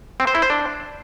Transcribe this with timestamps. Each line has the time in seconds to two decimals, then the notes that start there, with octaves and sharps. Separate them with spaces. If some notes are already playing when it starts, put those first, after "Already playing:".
0.20 C4
0.27 C5
0.35 E4
0.42 C5
0.50 D4